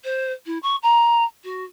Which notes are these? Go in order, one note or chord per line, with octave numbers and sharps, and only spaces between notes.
C5
E4
C#6
A#5
F#4